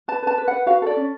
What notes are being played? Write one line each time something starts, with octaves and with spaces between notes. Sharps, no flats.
B4 A5
B4 A5
B4
F#5
B4
F#4 F5
A4 D5
C#4